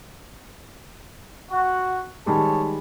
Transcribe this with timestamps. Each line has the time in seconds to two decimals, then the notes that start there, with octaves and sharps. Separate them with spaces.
1.51 F#4
2.26 D#3 G3 G#3 C#5 A5